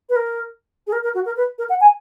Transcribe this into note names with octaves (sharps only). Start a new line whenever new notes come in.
B4
A#4
G#4
A#4
A#4
F#4
A#4
B4
A#4
F#5
G#5